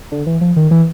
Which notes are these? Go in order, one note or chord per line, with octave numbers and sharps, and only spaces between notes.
D3
E3
F3
D#3
E3